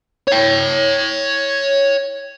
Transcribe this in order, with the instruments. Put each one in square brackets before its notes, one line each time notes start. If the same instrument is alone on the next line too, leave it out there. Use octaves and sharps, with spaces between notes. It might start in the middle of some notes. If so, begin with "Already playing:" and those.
[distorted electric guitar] C#5 G5